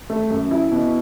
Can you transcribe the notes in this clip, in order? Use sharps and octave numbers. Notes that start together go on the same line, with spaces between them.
A3
F#2
E4
B2